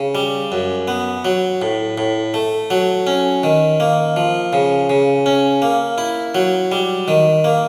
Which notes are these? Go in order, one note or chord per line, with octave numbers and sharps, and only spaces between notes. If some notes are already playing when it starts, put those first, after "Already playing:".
Already playing: C#3
G3
F#2
B3
F#3
A2
A2
A3
F#3
C#4
D#3
A#3
F3
C#3
C#3
C#4
A#3
E4
F#3
G3
D#3
A#3